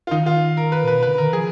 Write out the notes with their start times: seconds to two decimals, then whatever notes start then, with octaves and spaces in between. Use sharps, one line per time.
0.07 F4
0.11 D#3 D#4
0.26 F4
0.57 A#4
0.72 B4
0.84 A#2 B4
0.96 B2
1.03 B4
1.08 D3
1.18 D#3 A#4
1.33 F3 G#4